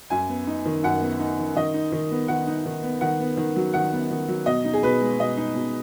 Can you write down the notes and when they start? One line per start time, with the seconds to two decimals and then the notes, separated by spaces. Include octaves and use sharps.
0.10 F#2 G#5
0.29 B3
0.47 D#4
0.65 D#3
0.83 F#2 F#5
1.02 B3
1.20 D#4
1.38 D#3
1.56 D#3 D#5
1.74 D#4
1.92 D#3
2.11 B3
2.28 D#3 F#5
2.47 D#4
2.65 D#3
2.83 B3
3.01 D#3 F#5
3.20 B3
3.37 D#3
3.56 F#3
3.74 D#3 F#5
3.92 B3
4.11 D#3
4.28 F#3
4.46 B2 D#5
4.65 D#4
4.74 G#4
4.83 B2 B4
5.01 G#3
5.19 B2 D#5
5.37 D#4
5.55 B2